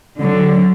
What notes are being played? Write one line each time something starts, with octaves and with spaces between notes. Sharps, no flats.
D3 F#3